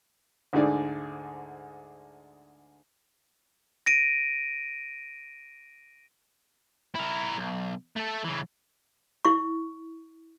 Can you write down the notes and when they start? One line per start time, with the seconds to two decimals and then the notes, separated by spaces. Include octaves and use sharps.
0.53 D2 G#2 D3 G#4 D5
3.86 A#6 D7 D#7
6.95 E4 A#4
7.38 B1
7.96 A3 A4
8.24 C#3 E3
9.25 E4 C#6